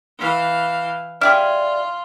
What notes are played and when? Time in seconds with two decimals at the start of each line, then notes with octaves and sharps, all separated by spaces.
0.19 E3 F5
1.21 E4 F4 G4 G#4 D5 F6